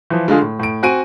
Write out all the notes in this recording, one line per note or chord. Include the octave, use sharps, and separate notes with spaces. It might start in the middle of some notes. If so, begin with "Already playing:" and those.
E3 F3
D3 G#3 F4 G#4
A2
A2 D7
C4 F#4 G#5 D7 D#7